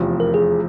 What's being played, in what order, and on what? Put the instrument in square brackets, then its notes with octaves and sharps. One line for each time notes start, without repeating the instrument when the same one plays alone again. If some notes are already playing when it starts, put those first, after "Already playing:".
Already playing: [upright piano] F1 E2 C3 F3
[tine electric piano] A#4
G#4